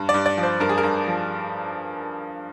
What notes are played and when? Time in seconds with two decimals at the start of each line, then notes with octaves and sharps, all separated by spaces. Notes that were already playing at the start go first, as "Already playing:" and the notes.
Already playing: G2
0.09 D5
0.14 G2
0.26 D5
0.38 F3
0.43 C5
0.60 G2 A#4
0.69 G#4
0.78 A#4
0.83 G2
1.07 F3